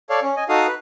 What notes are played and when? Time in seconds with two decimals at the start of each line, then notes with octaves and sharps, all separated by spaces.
0.10 A4 C#5 D5 F5
0.22 C#4
0.37 D#5 G#5
0.49 D#4 F#4 A4 F5 D#6
0.67 B4